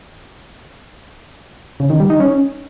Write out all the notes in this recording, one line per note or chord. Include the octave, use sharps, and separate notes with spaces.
C#3
D#3
G3
D#4
C#4